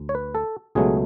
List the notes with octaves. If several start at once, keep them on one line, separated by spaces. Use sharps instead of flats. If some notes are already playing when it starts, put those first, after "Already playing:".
Already playing: D2
C#5
B4
A4
C#2 B2 F#3 A3 G#4